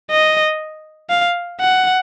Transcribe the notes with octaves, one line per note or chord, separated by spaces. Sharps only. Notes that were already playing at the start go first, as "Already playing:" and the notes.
D#5
F5
F#5